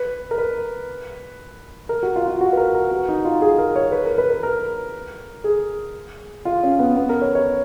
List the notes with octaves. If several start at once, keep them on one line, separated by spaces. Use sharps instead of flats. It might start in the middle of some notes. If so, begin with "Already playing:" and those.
Already playing: B4
A#4
B4
A#4
F#4
F4
F4
F#4
B4
A#4
A#4
F#4
D#4
F4
G#4
A#4
C#5
B4
A#4
B4
B4
A#4
G#4
F4
C#4
B3
B3
A#4
C#5
C#5